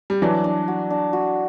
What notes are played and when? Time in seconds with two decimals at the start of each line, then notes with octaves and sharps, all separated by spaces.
0.10 G3
0.22 E3 F#3 D4
0.44 D4
0.68 F#4
0.90 D4
1.13 F#4